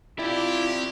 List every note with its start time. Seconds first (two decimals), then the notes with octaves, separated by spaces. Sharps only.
0.19 C4 E4 F4 G4 D5